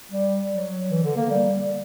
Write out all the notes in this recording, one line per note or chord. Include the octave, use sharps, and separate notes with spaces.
G3
F#3
E3
D3
A#3
G3